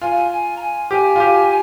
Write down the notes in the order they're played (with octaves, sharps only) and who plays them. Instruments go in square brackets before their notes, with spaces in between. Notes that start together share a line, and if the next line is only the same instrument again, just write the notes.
[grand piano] F4 [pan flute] G#5
[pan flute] G#5
A#5
G#5
[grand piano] G4 [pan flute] G#5
[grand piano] F4
G4